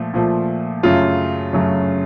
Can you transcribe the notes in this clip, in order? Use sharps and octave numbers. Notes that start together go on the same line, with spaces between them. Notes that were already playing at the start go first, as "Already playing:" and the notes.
Already playing: A#2 F3 A3
A#2 F3 A3
F#2 C#3 F#3 A3 F4
F#2 C#3 F#3 A3